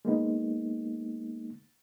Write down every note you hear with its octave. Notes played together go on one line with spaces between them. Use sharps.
G#3 A#3 B3 D#4